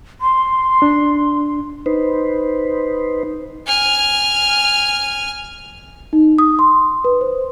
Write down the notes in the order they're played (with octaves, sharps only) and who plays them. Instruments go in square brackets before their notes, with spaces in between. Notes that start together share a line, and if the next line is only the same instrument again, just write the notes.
[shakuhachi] C6
[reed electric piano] D4
[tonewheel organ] D#4 B4 C5
[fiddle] G#5 F6
[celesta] D#4
D#6
C6
B4
C5